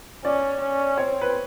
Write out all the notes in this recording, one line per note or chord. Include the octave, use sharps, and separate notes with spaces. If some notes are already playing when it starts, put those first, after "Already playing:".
C#4 D5
C#4
C4 C#5
B4